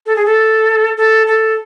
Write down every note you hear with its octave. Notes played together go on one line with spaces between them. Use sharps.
A4
G#4
A4
A4
A4